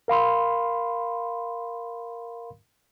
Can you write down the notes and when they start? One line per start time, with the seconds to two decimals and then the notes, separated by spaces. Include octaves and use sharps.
0.08 A#4 F5 B5 C6